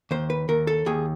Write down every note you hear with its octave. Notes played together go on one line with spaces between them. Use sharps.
D#2 C5
B4
D#2 A#4
A4
D#2 G#4